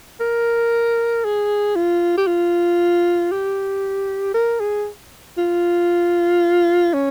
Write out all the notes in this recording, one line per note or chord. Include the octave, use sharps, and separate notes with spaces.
A#4
G#4
F4
G4
F4
G4
A#4
G#4
F4
C#4